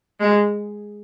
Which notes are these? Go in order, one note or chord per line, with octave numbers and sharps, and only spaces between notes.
G#3